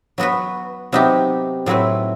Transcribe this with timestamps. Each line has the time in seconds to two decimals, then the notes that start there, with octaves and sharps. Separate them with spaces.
0.18 F#3 B3 F#4 B4
0.92 C3 F#3 B3 D#4 G4
1.66 A2 F#3 C4 E4 B4